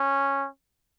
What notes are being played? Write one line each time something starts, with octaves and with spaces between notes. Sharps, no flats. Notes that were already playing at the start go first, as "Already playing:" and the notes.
Already playing: C#4